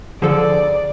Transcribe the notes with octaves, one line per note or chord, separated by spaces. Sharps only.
D3 F3 G#4 A4 D5